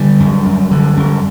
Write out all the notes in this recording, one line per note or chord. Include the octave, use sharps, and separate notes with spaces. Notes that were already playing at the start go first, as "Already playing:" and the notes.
Already playing: D3 G3
F#2
F#2
D3
F#2